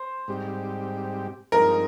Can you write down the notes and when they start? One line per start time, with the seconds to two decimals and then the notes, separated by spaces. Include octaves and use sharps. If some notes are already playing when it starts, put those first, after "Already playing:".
Already playing: C5
0.28 G#2 G3 C4 G4
1.52 G2 F3 G#3 C4 D#4 A#4